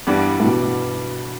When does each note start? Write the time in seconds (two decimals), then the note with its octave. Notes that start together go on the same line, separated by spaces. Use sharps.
0.07 G2 E3 G3 B3 D4
0.40 A2
0.44 B2